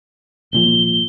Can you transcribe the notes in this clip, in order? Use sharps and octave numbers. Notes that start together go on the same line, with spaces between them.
G#1 A#2 F3 G7